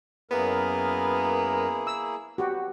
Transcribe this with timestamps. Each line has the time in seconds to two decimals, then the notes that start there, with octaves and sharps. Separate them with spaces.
0.31 F#2 A#3 B3 E4 G#4 A#4
1.87 E6
2.38 F#4 G4 B4